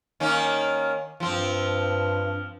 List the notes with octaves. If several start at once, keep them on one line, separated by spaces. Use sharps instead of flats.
D#3 A#3 C#4
G2 F3 C4